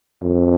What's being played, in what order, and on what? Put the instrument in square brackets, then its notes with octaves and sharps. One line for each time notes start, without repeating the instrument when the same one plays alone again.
[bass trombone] F2